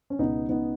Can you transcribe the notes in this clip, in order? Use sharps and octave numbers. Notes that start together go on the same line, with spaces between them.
C#4
C#2 B2 B3 D#4
B3 D#4